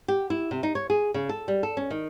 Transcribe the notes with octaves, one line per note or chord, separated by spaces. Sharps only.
G4
E4
C3
D#4
C#5
G#4
C#3
A4
G3
A4
C#4
D#3